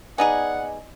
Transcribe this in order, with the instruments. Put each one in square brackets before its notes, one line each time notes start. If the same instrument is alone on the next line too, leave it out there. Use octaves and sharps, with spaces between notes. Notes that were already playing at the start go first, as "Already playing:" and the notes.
[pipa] B3 D#4 G#4 [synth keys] D5 D#5 G#5 [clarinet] F#5